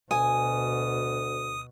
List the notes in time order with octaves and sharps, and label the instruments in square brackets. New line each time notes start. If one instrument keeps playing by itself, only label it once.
[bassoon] D2 [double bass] B2 [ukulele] G#5 [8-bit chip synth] D#6